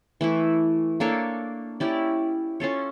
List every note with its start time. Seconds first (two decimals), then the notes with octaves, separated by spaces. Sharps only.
0.21 E3 A3 E4
1.00 A#3 D4 A4 C#5
1.80 C#4 E4 G4 D5
2.60 C#4 F4 A4 C#5